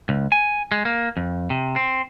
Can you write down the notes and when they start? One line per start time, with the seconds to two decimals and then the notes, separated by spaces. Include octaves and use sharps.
0.09 C#2
0.32 G#5
0.72 G#3
0.85 A#3
1.17 F2
1.50 C3
1.76 C4